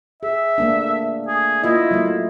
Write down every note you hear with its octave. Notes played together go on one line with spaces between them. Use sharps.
G#4 E5
A3 A#3 D4
G#4
A#3 E4 F4 D#5
F#3 A3